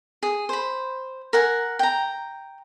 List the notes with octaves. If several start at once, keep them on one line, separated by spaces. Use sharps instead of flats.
G#4
C5 B5
A#4 F#5 G#5
G5 A#5